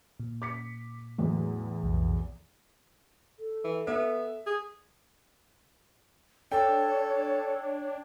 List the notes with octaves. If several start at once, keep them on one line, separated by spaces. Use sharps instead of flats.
A#2
D6 B6 C#7
E2 A2 F#3
B1 F2
A4
E3
B3 E5
G#4
D4 A4 C#5 G5